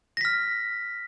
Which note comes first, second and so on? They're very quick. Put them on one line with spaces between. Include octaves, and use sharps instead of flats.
A#6 B6 F6